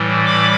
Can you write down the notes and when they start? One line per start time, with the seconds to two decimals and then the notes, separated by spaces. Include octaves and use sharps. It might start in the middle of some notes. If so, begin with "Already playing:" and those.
Already playing: A2 E3 G3
0.26 B5 D6